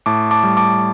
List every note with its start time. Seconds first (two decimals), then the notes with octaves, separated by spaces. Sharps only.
0.06 A2 A5 D6
0.31 A5 D6
0.43 G3
0.57 A5 D6